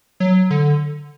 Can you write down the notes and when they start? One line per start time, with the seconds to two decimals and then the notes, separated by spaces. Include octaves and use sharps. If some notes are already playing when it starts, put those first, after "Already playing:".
0.20 F#3
0.50 D3